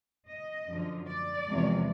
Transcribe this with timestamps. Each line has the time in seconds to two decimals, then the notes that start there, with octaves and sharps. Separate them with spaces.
0.28 D#5
0.67 F#2 D3 F3
1.07 D5
1.46 E2 C3 F3 G#3